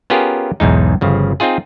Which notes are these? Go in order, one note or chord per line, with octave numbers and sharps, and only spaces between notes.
B3 C#4 F4 G4 G#4 A#4
B1 E2 G#2 D#4
G1 C#3 F3
C4 D#4 F4 G#4